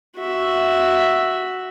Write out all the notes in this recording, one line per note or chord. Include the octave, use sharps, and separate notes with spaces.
F#4 E5